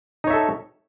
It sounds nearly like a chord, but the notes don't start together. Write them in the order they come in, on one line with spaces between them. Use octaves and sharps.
D#4 C#5 E5 A4